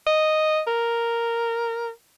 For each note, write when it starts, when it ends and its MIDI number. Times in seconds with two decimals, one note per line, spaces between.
0.07 0.61 75
0.67 1.91 70